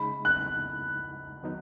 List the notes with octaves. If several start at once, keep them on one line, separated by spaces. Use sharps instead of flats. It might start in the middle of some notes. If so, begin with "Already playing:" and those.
Already playing: C#3 G#3 D#4 B5
F#6
D#3 F#3 B3 D#4